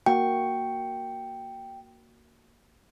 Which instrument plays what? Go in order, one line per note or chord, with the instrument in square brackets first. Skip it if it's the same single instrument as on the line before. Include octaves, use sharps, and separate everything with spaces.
[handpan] A#3 F#4 [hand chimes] G5